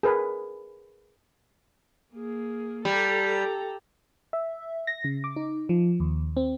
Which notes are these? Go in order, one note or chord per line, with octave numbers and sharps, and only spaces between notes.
G#4 A#4 B4
A#3 G#4
G3 A4 A#5
E5
A#6
C#3
D6
D#4
F3
D#2
C4